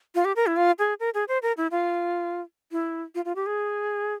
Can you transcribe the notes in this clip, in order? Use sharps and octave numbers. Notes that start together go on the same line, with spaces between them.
F4
G4
A#4
E4
F4
G#4
A#4
G#4
C5
A#4
E4
F4
E4
F4
F4
G4
G#4